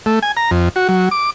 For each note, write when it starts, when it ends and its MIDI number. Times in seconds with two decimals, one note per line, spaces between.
0.06 0.19 57
0.23 0.32 80
0.37 0.51 82
0.51 0.69 41
0.76 0.88 66
0.89 1.09 54
1.11 1.30 86